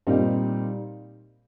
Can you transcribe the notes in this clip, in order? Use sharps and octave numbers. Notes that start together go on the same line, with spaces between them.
A#2 G3 C4 D#4